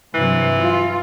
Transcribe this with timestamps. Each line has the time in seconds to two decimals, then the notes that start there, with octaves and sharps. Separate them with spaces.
0.14 G2 C3 E3 F#3
0.61 F4